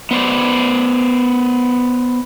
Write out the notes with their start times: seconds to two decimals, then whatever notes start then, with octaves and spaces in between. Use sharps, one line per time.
0.11 B3 C5 D5